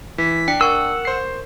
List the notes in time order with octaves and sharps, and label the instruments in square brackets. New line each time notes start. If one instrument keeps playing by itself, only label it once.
[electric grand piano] E3 [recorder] B6
[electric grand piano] D4 [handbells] G5 C#7
[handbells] A#4 C#6 [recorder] F#5 [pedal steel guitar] E6
[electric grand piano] C5 C7